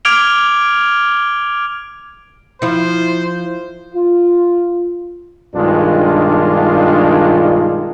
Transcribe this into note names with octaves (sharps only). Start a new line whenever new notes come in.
D6 F6 G#6 D7 F7 G7
F3 E4 C5
F4
B1 G2 D#3 G#3 D4 F4